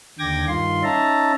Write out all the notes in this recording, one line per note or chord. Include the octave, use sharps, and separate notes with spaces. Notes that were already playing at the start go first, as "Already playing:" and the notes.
D#2 D3 G5 D6 G#6 A#6
G2 D#3 F4 C6
C#4 D#4 E5 A5 A#5